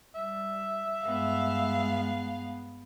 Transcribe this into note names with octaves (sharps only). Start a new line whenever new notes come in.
G3 E5
G2 G#3 B3 F5